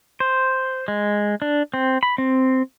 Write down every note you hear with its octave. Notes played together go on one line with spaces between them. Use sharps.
C5
G#3
D4
C4
B5
C4